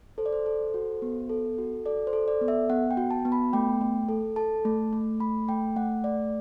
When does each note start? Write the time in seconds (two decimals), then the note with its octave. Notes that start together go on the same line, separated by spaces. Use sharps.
0.18 A4 C5
0.26 D5
0.33 C5
0.46 A4
0.74 F#4
1.02 B3
1.29 A4
1.58 F#4
1.86 A4 D5
2.07 C5
2.13 A4
2.28 D5
2.41 B3
2.48 E5
2.70 B3 F#5
2.91 G5
2.97 F#4
3.11 A5
3.25 B3
3.32 B5
3.53 A3 G5
3.81 A3
4.09 A4
4.36 A4 A5
4.65 A3
4.93 A3
5.20 A3 B5
5.48 A3 G5
5.76 A3 F#5
6.04 A3 D5